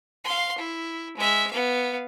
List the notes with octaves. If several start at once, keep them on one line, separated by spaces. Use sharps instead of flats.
F5 C6
E4
G#3 E5
B3 F5